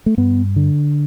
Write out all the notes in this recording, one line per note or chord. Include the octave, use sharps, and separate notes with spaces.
A3
G2 B3
D3